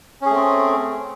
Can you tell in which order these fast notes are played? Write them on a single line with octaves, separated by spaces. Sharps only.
C#4 G#4 A3 C4